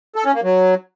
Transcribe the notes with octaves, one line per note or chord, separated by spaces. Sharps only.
A4
C#4
A#3
F#3